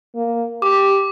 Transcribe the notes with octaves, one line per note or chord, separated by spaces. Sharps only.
A#3
G4 D6